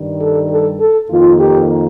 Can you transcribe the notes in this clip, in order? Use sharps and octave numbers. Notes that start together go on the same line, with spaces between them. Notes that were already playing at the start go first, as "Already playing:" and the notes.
Already playing: G2 D#3 G3
A4
A4
A4
F2 D#3 A#3 F4
G4